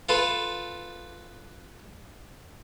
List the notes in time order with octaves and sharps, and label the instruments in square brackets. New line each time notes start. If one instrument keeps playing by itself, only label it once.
[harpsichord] F4 A4 B4